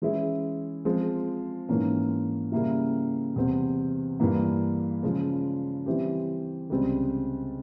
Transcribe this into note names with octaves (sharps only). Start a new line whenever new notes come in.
E3 G#3 C#4 E4 G#4
F3 G#3 C4
G#2 E3 A#3 C#4
C#3 G3 A#3 E4
E2 C3 G3 C4
G2 E3 A#3
C#3 F3 G#3
E3 G3 C4 E4 G4
C#2 C3 G3 C4